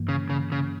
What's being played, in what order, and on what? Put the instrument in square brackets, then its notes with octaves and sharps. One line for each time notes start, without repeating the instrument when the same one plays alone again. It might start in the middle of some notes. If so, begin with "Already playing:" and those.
Already playing: [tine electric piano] G2 E3 A#3
[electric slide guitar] C#3
C#3
C#3